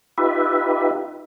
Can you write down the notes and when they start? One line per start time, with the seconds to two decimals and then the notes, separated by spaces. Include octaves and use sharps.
0.18 D#4 F4 G4 B4 E5